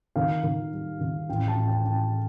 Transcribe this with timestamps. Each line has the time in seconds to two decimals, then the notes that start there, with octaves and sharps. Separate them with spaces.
0.16 D#3 F5
0.43 D#3
0.72 G3
1.01 D#3
1.29 A1 G5
1.48 A5
1.57 A1
1.67 G5
1.85 A1 G5